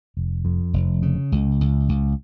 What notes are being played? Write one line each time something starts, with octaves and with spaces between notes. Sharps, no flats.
F1
F2
F1
C#3
C#2
C#2
C#2